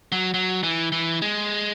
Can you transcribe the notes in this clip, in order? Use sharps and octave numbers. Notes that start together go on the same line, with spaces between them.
F#3
F#3
E3
E3
G#3